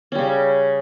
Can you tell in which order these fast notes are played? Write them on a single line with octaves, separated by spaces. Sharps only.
C#4 G3 C#3